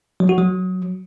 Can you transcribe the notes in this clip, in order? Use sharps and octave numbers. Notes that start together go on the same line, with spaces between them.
F#3
F#4
F#3